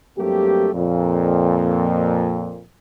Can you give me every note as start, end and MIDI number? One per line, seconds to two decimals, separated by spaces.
0.18 0.70 43
0.18 0.70 54
0.18 0.70 57
0.18 0.70 58
0.18 0.70 60
0.18 0.70 67
0.74 2.62 41
0.74 2.62 46